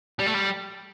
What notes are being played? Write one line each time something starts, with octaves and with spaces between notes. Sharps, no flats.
G3
A3
G3